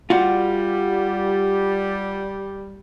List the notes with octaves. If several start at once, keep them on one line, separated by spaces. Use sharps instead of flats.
G3 F4 F#4